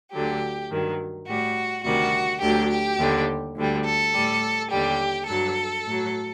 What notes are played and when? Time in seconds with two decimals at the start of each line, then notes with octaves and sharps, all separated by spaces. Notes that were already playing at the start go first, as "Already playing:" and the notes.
0.12 D2 D3 F#3 G4
0.70 G2 D#3 F#3
1.28 A2 G3 F#4
1.84 D2 C3 D#3 G3 F#4
2.41 D2 D3 F#3 G4
2.70 G4
2.98 D#2 D3 G3
3.56 D2 D3 G3
3.85 A4
4.14 A2 G3
4.70 D#2 D3 G3 G4
5.27 G2 F#3 A4
5.86 A2 F#3